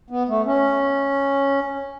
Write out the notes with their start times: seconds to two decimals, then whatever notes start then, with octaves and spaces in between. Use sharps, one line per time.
0.10 B3
0.29 A3
0.46 C#4